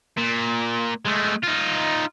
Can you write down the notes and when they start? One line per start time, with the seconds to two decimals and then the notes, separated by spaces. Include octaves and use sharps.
0.18 A#2
1.05 G#3 A3
1.43 D#4 F4